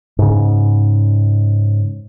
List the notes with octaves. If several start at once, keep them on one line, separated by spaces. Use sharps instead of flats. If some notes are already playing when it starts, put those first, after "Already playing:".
G#2 C#3